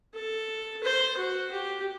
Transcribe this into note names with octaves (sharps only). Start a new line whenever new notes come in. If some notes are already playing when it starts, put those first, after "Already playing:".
A4
C5
F#4
G4